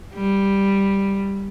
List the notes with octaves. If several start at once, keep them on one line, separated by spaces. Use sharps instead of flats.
G3